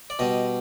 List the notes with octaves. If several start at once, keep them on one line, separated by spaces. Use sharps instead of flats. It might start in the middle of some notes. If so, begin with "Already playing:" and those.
D5
B2 G3 D#5